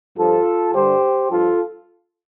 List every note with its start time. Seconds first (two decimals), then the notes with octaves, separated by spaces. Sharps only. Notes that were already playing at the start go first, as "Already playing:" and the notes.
0.17 G2 F3 F4 A4
0.74 G2 D3 G3 G4 C5
1.31 G2 F3 F4 A4